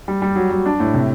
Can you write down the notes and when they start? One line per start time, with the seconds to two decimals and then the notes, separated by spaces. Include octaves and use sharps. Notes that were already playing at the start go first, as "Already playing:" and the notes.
0.08 G3
0.22 G3
0.36 F#3
0.51 F#3
0.66 D4
0.80 A2
0.94 C3